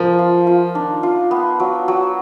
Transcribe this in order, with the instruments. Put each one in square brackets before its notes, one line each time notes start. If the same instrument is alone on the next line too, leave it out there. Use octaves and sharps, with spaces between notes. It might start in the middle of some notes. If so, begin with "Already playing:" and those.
Already playing: [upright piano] F3 [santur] A#4
[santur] F4
F4
[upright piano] D#3 [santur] D4
[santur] F4
B3
F#3
F#3